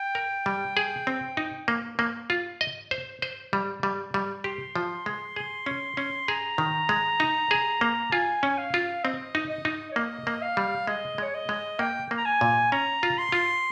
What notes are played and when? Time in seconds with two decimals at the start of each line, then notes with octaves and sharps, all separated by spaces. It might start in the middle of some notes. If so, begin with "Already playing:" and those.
Already playing: G5
0.15 A#4
0.46 G3
0.77 G#4
1.07 C4
1.37 D#4
1.68 A#3
1.99 A#3
2.30 F4
2.61 D#5
2.91 C5
3.22 C5
3.53 G3
3.83 G3
4.14 G3
4.44 G4 C6
4.76 F3
5.06 G#3
5.36 G#4
5.66 C#4
5.97 C#4
6.28 G#4 A#5
6.58 D#3
6.89 G#3
7.20 D#4
7.51 G#4
7.81 A#3
8.12 F4 G#5
8.43 C#4
8.58 F5
8.74 F4
9.04 C4 D#5
9.35 D#4
9.50 D#5
9.65 D#4
9.92 C#5
9.96 A#3 D#5
10.27 A#3
10.42 F5
10.57 G3
10.87 G#3 D#5
11.18 G#3 C#5
11.34 D#5
11.49 G#3
11.79 A#3 G5
12.11 A#3
12.17 A#5
12.26 G#5
12.41 A#2
12.72 C#4 A#5
13.03 F4
13.18 C6
13.32 F4